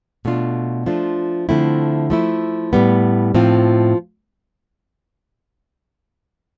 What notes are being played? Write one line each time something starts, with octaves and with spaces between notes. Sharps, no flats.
B2 A3 D4 F4
F3 A3 D4 F4
D3 F3 A3 C4 E4
F3 A3 E4
A2 G3 B3
A2 F3 C4 F4